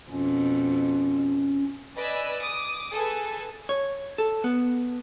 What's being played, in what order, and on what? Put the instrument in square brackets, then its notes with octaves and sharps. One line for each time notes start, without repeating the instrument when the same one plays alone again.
[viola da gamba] F2 B2 [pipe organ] C#4
[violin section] B4 D5 D#5 G#5 B5 E6
D6 D#6
G#4 A4 B4 G#5
[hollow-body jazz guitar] C#5
A4
B3